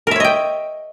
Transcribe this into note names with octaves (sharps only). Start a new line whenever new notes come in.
A#4 C#5 D#5 E5 G5